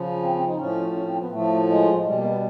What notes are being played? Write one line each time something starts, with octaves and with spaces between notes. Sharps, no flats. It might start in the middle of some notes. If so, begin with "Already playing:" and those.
Already playing: C#3 F3
C4
C4
D#4
A2 F3 C#4
C#4
C4
B3
A2 F3 A3
G#3
B2 G3 G#3
A#3
B3